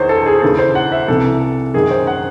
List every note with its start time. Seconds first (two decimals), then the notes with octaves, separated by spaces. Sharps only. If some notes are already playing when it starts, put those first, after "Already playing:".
Already playing: E2 D#3 C5 C#5
0.09 A4
0.26 G#4
0.42 D#2 C#3 E3 A4
0.59 C5
0.75 F#5
0.92 E5
1.08 C2 C3 E3 A4
1.74 F#2 D#3 G#4
1.91 C5
2.07 F#5